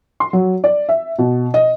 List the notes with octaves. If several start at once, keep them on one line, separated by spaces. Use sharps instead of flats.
C6
F#3
D5
E5
B2
D#5